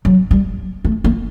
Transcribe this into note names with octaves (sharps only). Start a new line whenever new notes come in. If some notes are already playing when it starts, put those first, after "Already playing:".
F#3
G3
A3
A#3